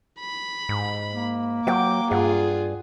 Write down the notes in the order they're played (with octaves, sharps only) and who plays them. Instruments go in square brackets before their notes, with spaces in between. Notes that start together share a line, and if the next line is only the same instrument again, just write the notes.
[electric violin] B5
[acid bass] G#2
[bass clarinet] A#3
[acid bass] F#3 [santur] F#5 G5 [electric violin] D6
[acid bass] G2 [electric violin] F4 G#4 [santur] F#5